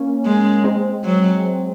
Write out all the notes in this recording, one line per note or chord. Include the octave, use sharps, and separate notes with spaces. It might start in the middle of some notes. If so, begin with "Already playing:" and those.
Already playing: A#3 C#4
G#3
G#3 C4
F#3